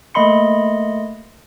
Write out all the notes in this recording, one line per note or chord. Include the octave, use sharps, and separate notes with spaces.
A3 A#3 D#5 B5 C6 C#7